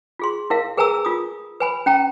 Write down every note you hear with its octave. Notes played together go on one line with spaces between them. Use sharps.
F4 G#4 C6
E4 A#4 F5
G#4 A#4 B4 G#5 A#5 E6
F4 D#6
B4 G#5 B5
C#4 G5 A#5